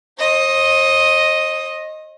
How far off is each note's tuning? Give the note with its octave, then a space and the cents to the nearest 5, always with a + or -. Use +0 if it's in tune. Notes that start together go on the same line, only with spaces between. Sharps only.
C5 +40 D#5 +0